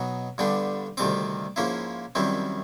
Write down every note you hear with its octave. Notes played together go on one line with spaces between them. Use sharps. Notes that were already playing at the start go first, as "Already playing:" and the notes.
Already playing: B2 F#3 B3 D#4
G2 D3 G3 B3 D4
D2 C3 D#3 G3 C4 D6
G#2 F3 A#3 C#4 E4
F#2 D#3 G3 C4 E4